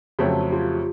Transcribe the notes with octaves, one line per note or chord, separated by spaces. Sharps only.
F2 C#3 F#3 A3 C4 G#4
G4
F#4
F4 G4